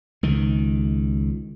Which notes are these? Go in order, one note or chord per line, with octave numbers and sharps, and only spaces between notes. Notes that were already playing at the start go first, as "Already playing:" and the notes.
C#2 D#3